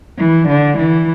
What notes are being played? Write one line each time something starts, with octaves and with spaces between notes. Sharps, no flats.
E3
D3
E3